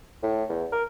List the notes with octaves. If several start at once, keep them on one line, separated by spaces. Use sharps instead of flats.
A2
E2
A#4